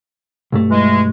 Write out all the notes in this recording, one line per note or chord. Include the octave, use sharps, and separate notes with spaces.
B1 G2 A3
E3 G#3